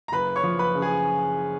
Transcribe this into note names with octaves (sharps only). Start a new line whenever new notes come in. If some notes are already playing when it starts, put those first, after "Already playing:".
A#5
F#1 B4 B5
C#5 C#6
F3
B4 B5
C#3
G#4 G#5